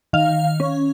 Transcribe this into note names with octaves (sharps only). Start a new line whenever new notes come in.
D#3 F5
C#4